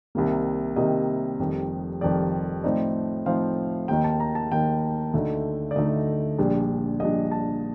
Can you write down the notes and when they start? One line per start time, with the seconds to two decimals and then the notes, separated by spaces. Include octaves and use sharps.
0.15 C2 C3 D#3 G3 A#3
0.76 C2 C3 D#3 G3 A#3 D#5
1.39 F1 F2 D#3 G3
2.01 F1 F2 D#3 G3 D5
2.64 A2 F3 C4 D#4 D5
3.26 A2 F3 C4 D#4 F5
3.88 D#2 D#3 A#3 D#4 G5
4.04 A5
4.20 A#5
4.35 A5
4.51 D#2 D#3 A#3 D#4 G5
5.13 D2 D3 A3 D#4
5.71 D5
5.75 D2 D3 A3 D#4 D#5
6.39 A#1 A#2 G3 D4
7.00 A#1 A#2 G3 D4 D#5
7.31 A5